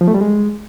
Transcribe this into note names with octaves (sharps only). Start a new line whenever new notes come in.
F3
A3
G3
G#3